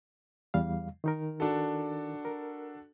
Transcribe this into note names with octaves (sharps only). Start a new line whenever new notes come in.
E2 G3 F5
D#3 D#4 A#4
D4 F#4 A4
A#4